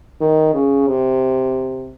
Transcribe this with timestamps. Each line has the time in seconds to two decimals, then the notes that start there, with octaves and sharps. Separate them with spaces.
0.21 D#3
0.54 C#3
0.87 C3